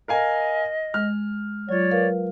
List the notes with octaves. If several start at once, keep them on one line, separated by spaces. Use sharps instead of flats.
A#4 D#5 F5 G#5
G#3 F6
F#3 F4 C#5 D5
A#4 B4 F5